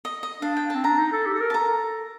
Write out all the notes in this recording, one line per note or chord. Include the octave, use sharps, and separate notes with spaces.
D#5
D#5
D4 F5
G5
A5
C4
D4 A#5
D#4
A4
G4
A4
A#4
A5
A4 A#5